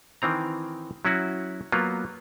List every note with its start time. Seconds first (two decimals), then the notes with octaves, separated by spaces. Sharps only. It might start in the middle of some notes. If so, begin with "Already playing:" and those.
0.22 D#3 E3 C4 A#5
1.05 F#3 C#4 E4 F#4
1.72 F#3 A#3 B3 F4